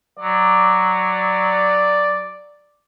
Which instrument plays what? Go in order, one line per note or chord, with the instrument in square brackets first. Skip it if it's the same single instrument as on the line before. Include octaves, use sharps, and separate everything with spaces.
[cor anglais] F#3 [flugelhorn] D5